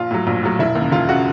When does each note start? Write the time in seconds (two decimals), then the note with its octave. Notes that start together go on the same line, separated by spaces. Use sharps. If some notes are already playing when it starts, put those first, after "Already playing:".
Already playing: A#1 F4
0.11 A2 F#3
0.27 A#1
0.43 A2 F#3
0.59 E1 E4
0.75 D#2 C#3
0.92 E1 F4
1.09 C#3 F#4